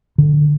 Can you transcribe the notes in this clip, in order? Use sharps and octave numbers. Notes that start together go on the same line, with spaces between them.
D3